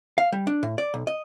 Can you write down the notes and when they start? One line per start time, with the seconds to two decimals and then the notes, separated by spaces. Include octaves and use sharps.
0.18 F5
0.32 G3
0.47 D4
0.63 A2
0.78 D5
0.94 B1
1.07 D#5